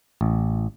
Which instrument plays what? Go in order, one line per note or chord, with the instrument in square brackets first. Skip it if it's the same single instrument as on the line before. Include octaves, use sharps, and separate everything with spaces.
[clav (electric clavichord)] A1